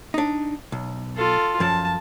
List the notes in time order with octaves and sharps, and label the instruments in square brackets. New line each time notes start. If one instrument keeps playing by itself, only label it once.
[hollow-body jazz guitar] D4 D#4
B1
[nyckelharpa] F4 A4
[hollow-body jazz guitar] F#2 F3 [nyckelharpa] A5